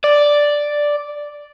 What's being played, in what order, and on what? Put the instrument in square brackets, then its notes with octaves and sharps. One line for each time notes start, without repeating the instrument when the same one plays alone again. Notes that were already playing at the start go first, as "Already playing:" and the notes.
[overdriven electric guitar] D5